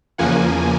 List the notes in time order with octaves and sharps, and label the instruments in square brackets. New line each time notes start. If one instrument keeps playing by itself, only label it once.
[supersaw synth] E2 C#3 F3 A#3 F#5 G#5